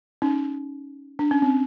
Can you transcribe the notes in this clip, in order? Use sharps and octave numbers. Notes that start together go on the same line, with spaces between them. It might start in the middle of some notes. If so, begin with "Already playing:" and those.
C#4 D#4
D4
C#4
C4